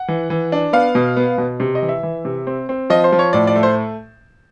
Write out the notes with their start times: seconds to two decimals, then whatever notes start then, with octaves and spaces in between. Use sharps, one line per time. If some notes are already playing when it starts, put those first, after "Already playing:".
Already playing: F#5
0.08 E3
0.30 E3
0.52 D4
0.73 B3 F5
0.95 B2
1.16 B3
1.38 B2
1.60 C3
1.75 D#5
1.82 E3
1.89 E5
2.03 E3
2.25 C3
2.47 C4
2.69 C4
2.90 F3 D#5
3.04 C5
3.12 F3
3.19 C#5
3.33 A2 D5
3.47 D5
3.56 A3
3.63 C5